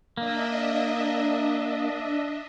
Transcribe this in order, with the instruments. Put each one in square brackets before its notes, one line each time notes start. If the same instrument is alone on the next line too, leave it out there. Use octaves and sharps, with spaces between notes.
[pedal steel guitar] A#3 [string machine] D4 D#5 E5